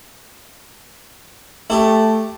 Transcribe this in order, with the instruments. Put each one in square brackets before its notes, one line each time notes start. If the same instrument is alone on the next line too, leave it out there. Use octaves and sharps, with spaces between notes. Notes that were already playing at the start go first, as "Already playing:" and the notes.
[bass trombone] A3 [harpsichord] E4 G4